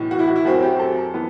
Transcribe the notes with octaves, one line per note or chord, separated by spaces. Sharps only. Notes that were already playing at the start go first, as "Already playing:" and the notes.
Already playing: B1 A2 E3
F#4
E4
F#4
E4
F#2 F#3 C4 F#4
G4
A4
E3 B3